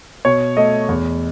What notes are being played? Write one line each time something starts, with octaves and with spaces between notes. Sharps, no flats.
B2 C#5
A3 D#5
E2